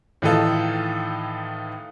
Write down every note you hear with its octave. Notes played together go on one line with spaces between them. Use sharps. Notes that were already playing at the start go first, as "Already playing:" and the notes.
A2 D#3 E3 D#4 F4 A4